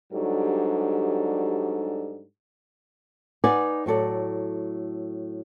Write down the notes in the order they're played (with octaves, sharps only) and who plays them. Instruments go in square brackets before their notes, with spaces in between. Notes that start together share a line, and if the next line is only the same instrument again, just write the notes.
[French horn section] G#2 F#3 G3 D4 G4 A4
[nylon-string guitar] D#4 B4 D5 F#5 G#5
A2 F#3 A4 D5